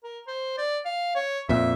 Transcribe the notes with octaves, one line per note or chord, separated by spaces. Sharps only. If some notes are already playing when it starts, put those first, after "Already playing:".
A#4
C5
D5
F5
C#5
F2 A#2 E5